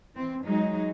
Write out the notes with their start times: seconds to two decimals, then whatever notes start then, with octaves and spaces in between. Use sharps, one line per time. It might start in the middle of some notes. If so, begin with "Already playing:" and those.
0.14 E3 C4
0.45 F#3 G#3 D#4